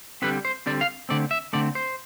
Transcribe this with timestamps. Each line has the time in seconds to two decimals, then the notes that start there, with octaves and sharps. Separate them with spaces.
0.22 D3 G3 C4 B4
0.45 C5
0.66 D3 G3 C4 D5
0.81 F5
1.09 D3 A3 C4 D5
1.31 E5
1.53 D3 A3 C4 D5
1.75 C5